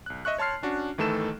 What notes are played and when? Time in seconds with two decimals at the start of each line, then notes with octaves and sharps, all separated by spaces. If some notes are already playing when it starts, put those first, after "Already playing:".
0.06 B1 F#6
0.25 D#5 E5 C#6 F#6
0.38 C#5 A5 C6 F6 C7
0.63 C#4 D4 F#4
0.98 G1 D#3 E3 A3 A4 E7